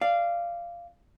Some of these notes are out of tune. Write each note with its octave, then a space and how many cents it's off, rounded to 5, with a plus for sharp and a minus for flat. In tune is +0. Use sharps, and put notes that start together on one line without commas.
D5 +5 F5 -15